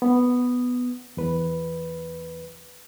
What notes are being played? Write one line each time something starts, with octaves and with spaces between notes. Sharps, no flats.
B3
E2 B4